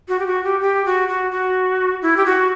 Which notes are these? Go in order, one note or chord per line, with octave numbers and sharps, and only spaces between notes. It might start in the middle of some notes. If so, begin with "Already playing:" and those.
F#4
G4
F#4
G4
G4
F#4
F#4
F#4
E4
G4
F#4